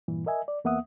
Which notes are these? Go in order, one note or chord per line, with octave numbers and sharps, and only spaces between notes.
G2 A#2 E3
A#4 D#5 E5 G#5
D5
E2 A#3 B3 E5 F#5 D#6